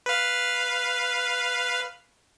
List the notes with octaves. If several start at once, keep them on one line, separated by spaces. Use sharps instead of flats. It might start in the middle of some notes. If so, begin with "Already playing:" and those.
B4 F5